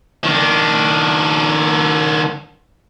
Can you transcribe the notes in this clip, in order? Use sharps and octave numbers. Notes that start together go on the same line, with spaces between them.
D#3 D4